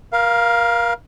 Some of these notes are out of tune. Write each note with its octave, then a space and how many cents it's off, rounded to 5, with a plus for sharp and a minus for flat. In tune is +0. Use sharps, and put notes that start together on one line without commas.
A#4 +30 F5 +0